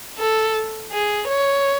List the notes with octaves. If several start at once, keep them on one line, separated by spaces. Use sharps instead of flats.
A4
G#4
C#5